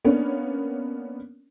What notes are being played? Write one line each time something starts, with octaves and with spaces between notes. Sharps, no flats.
A#3 B3 C#4 D4